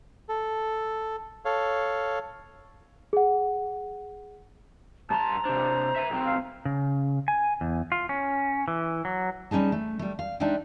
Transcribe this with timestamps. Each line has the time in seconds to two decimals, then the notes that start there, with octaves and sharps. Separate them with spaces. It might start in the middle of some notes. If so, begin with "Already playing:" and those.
0.29 A4
1.45 A4 C#5 F5
3.13 G#4 F#5
5.10 G2 A5 A#5 C6
5.45 C3 D4 C5
5.96 E5 G#5
6.10 B1 C4
6.26 F5
6.65 C#3
7.28 G#5
7.61 E2
7.92 F4
8.09 C#4
8.68 E3
9.05 F#3
9.51 G3 C#4 D#4 G#4 A5
9.72 A3
9.99 G3 A3
10.19 F5
10.40 G#3 D4 D#4 D5 E5 G5